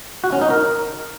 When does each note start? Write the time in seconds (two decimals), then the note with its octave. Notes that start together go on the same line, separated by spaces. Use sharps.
0.24 F#4
0.33 C#4
0.41 D#4
0.50 A#4